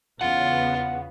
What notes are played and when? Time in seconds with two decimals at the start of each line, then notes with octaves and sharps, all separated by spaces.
0.21 E2 C#3 B3 F4 F#5